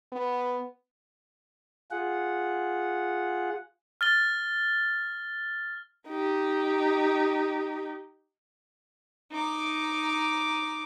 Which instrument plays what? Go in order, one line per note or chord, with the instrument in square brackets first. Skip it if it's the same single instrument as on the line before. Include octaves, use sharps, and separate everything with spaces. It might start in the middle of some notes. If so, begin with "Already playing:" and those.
[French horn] B3
[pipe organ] F4 G#4 F#5
[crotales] F6 A6 G7
[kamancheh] D#4 G4
[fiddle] D#4 D6